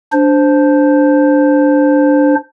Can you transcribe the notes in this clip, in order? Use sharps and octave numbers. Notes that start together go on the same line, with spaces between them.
D4 C5